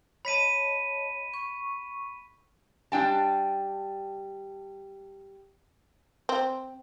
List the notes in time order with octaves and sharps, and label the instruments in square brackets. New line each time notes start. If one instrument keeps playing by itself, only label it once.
[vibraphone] C#5 D#5 A5 [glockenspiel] B5 B6 D#7
[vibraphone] C#6
[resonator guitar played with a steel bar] G3 D4 G5 A5
[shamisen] C4